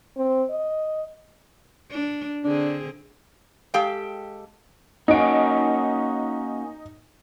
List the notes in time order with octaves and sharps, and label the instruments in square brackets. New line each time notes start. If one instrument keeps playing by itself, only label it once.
[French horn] C4
D#5
[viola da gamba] D4
[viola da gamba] D3 C4 G#4 [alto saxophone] D4
[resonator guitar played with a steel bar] G#3 G4 A4 F5 G5
[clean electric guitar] A#3 C#4 F#4 [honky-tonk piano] D#4 D7